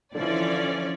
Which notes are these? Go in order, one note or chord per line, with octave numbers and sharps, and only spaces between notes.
D3 E3 F3 C#4 C#5 D5